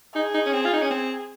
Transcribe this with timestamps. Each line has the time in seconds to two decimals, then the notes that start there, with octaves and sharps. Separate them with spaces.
0.16 D#4 G#4
0.34 D#4
0.46 C#4
0.53 C4
0.65 F4
0.73 D#4
0.82 C#4
0.91 C4